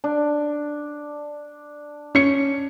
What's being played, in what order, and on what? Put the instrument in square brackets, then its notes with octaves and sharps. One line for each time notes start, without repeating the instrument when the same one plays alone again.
[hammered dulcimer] D4
[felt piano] C#4 C#7